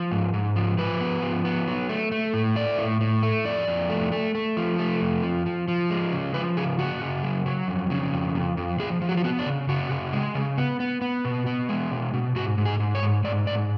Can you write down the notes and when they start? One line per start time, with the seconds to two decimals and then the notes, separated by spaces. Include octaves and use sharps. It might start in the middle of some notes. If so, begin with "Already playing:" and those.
Already playing: F3
0.11 G#2
0.34 G#2
0.56 F3
0.78 F3 B4
1.01 B3
1.22 F3
1.45 B3
1.67 F#3
1.89 A3
2.12 A3
2.34 A2
2.56 A3 D5
2.78 A2
3.01 A2
3.23 A3
3.45 F2 D5
3.68 F2
3.90 A3
4.12 A3
4.35 A3
4.57 F3
4.79 A3
5.01 F2
5.23 F3
5.46 F3
5.68 F3
5.90 G#3
6.12 C#3
6.34 F3 B4
6.57 C#3 G#4
6.79 C#3 F#4
7.01 C#3
7.23 F#3
7.46 F#3
7.68 F2
7.90 C#3
8.13 F2
8.35 F2
8.57 F2
8.79 F3 G#4
9.02 F3
9.09 F#4
9.17 F4
9.24 B3 F#4
9.39 D4
9.46 C#3
9.69 C#3 F#4
9.91 C#3
10.13 G#3
10.35 C#3
10.58 B3
10.80 B3
11.01 B3
11.25 B2
11.46 B3
11.69 G#3
11.91 B2
12.14 B2
12.35 G#2 F#4
12.58 G#2
12.65 G#4
12.80 G#2
12.95 C#5
13.02 G#2
13.24 G#2 D5
13.47 G#2 D5